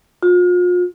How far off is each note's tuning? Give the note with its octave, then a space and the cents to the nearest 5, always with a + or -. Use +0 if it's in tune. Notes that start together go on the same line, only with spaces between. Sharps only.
F4 +40